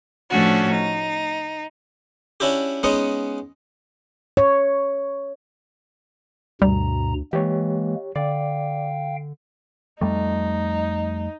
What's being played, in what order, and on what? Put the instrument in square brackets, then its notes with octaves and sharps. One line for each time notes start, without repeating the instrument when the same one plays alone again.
[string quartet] A2 F3 A3 C#4 D4 F#4
D#4
[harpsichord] C#4 D4 E4 F#4 G4
G#3 B3 C#4 D#4 D#5 F#5
[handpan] C#5
[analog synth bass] D2 [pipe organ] G2 B2 A#5 [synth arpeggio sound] G3
[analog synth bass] E3 [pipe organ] G#3 A#3 [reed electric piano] G4 C#5
[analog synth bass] D3 [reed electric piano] D5 [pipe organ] F5 G5
[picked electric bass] F2 G3 A3 [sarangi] D#4